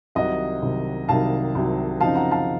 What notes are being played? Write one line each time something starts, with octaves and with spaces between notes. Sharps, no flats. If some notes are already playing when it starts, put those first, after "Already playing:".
C2 C3 D#3 F#3 D#5 F#5
C2 C3 D#3 F#3
C2 C3 D#3 F#3 F5 A5
C2 C3 D#3 F#3
F#2 C#3 F3 C4 D#4 F5 A5
F#5 A#5
F5 A5